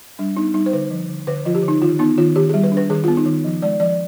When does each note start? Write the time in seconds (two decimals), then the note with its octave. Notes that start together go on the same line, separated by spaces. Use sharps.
0.19 G3 D4
0.37 B3 D#4
0.54 G3 D#4
0.66 C5
0.73 D3 B4
0.90 F3
1.09 D3
1.27 D3 B4
1.45 F3 F4
1.55 G4
1.63 D3
1.68 D#4
1.82 D#3 F4
1.99 B3 D#4
2.18 D#3 F4
2.36 D#3 G4
2.49 G3 G#4
2.63 B4
2.72 D4
2.77 B4
2.90 D#3 G#4
3.04 B3 F4
3.17 D#4
3.26 D#3
3.44 F3
3.62 G#3 D5
3.80 F3 D5